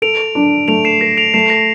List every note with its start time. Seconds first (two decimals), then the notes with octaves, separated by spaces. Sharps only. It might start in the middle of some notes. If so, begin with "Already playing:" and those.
0.02 A4 D7 F7
0.35 D4
0.68 A3 D7 F7
0.85 C7 E7
1.01 A4 A#6 D7
1.17 D7 F7
1.34 A3 C7 E7
1.50 A#6 D7